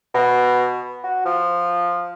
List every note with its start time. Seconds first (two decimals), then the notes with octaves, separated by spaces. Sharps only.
0.14 B2
1.04 F#4
1.25 F3